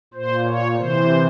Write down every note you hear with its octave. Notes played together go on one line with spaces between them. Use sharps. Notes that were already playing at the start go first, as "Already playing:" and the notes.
A#2 C5
C#5
C3 E3 C5